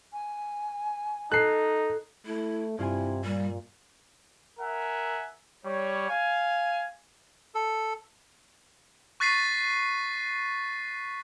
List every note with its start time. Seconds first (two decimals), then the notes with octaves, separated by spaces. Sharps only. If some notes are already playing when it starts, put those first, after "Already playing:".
0.13 G#5
1.32 D#4 A4 F#6 C7
2.26 A3 E4
2.78 G2 C3 E4 F4 G#5
3.24 A#2 G3
4.60 A#4 E5 F#5 G#5
5.65 G3 C#5
6.10 F5 G#5
7.55 A4
9.20 C#6 F#6 A6 B6 C7 D#7